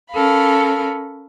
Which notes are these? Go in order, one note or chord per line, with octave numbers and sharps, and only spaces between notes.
C#4 A4 A#4 F5 B5